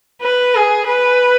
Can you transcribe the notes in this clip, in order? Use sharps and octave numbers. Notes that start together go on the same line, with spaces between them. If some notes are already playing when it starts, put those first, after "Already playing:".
B4
G#4
B4